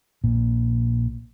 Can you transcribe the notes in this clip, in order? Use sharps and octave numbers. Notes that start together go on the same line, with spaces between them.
A#1 A#2